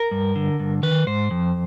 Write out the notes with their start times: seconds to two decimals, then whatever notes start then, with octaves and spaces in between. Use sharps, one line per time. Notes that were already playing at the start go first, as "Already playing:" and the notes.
Already playing: A#4
0.11 G2
0.36 D3
0.60 G2
0.83 D#3 B4
1.07 G#2 C5
1.31 F2